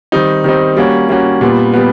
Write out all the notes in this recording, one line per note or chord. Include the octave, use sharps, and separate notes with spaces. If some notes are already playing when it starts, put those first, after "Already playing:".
D#3 G3 C4 D#4
D#3 G3 C4 D#4
G3 A#3 C#4 F#4
G3 A#3 C#4 F#4
A#2 G3 B3
G3 B3